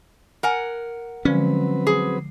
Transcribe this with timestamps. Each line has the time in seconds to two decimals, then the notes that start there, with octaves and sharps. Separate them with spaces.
0.43 A#4 F#5 G#5
1.25 D3 F3 F#3 G#3 C4 C#4 B4
1.87 G#4